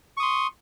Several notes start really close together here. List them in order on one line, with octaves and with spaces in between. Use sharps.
C#6 D#6 C6